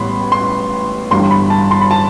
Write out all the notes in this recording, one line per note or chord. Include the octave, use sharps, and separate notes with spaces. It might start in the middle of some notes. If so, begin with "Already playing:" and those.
Already playing: A1 A2 G3 B3 B5 C6
C6
G1 G2 E3 G3 C6
B5
A5
C6
B5
A5